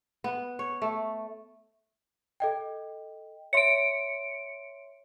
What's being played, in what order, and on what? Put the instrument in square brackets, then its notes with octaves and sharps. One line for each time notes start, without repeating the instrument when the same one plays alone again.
[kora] B3
C#5
A3
[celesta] A4 D#5 G5
[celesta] C#5 E5 C6 [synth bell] C#7 D7